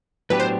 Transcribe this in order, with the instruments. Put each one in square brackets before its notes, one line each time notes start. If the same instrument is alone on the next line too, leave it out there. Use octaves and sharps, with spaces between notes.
[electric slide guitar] A2 F#3 B3 D4 G4 [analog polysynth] B4
[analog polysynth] C5